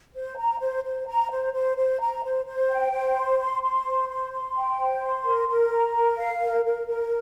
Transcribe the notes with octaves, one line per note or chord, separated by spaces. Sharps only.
C5
A#5
C5
C5
A#5
C5
C5
C5
A#5
C5
C5
G5
C5
C6
C6
C6
C5
C6
C6
G5
C5
C6
A#4
A#4
A#5
A#4
F5
A#4
A#4
A#4